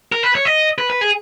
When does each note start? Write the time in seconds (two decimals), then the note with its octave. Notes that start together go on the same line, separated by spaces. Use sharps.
0.12 A#4
0.23 B4
0.35 C#5
0.45 D#5
0.78 B4
0.90 B4
1.01 G#4